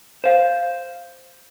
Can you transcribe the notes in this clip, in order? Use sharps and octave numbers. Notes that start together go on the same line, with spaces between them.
C5 F5